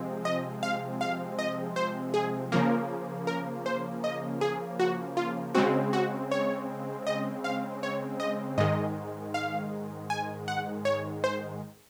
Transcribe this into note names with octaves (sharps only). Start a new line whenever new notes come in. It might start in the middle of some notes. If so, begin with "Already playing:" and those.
Already playing: C3 F3 G#3 C4
D#5
F5
F5
D#5
C5
G#4
C#3 F3 A#3 A#4
A#4
C5
D#5
G#4
F#4
F4
C#3 G#3 C4 F#4
F#4
C#5
D#5
F5
C#5
D#5
G#2 D#3 G#3 D#5
F5
G#5
F#5
C#5
C5